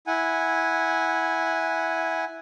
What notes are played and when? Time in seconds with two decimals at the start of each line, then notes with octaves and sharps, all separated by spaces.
0.07 E4 F#5 G#5